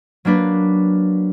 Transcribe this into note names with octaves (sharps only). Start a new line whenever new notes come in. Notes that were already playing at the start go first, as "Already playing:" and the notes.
F#3 A#3 D4 B4